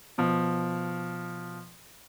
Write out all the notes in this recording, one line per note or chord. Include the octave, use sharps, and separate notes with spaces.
B2 F3